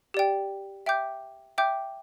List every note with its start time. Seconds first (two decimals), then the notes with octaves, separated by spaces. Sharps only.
0.14 G4 D5 G5
0.86 E5 G5 D6 G6
1.58 E5 G5 D6 G6